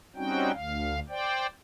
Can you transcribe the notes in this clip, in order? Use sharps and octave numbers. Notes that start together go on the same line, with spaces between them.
G3 C4 C#4 D#4 F#4 G5
D2 F5
C5 D5 G5